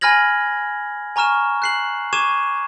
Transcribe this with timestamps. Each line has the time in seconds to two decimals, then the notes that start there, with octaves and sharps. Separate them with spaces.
0.01 G#5 B5 F6 G#6 A#6 F#7
1.16 G#5 A#5 C#6 F6 E7
1.62 F#6 C7 F#7
2.13 C#6 D6 G#6 D#7 E7